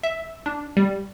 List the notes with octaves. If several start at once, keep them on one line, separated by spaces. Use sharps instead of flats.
E5
D4
G3